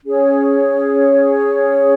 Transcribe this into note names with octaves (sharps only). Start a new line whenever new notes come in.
C#4 G#4 C#5